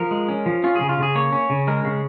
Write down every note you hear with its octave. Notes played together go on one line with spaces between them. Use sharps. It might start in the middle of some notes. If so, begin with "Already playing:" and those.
Already playing: F3 A#4
G#3
C#4
F3
C#4 F4
C#3 G#4
F4
C#3 G#4
A#3 C#5
C#4
C#3
G#3 A#4
C#3